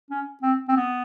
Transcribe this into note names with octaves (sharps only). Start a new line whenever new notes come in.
C#4
C4
C4
B3